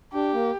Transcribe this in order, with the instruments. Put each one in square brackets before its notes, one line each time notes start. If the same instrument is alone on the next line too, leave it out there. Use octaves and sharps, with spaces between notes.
[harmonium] D4 [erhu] G4
[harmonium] A#3